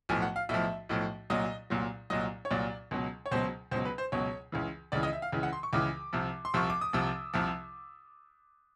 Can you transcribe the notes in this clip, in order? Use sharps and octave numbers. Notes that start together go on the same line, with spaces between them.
B1 A2 F3 G#5
F#5
F5
B1 A2 F3 E5
B1 A2 F3
C2 A#2 F#3 D#5
C2 A#2 F#3
C2 A#2 F#3 D#5
C#5
C2 A#2 F#3 D5
C#2 B2 F#3
C#5
C#2 B2 F#3 C5
C#2 B2 F#3 C5
B4
C5
C#2 B2 F#3 C#5
C#2 C#3 E3
C#2 C#3 E3 D5
D#5
E5
F5
C#2 C#3 E3
F#5
C6
C#6
C#2 C#3 E3 D6
C2 C3 F3
C6
C2 C3 F3 C#6
D6
D#6
C2 C3 F3 E6
C2 C3 F3